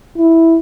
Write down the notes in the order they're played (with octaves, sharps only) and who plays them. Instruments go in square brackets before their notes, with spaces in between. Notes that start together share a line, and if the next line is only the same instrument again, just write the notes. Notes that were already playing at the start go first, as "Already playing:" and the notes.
[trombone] E4